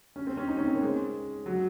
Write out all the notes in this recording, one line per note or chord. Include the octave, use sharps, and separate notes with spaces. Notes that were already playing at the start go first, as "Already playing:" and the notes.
C#4
C4
C#4
D#4
C#4
C4
A#3
G#3
F#3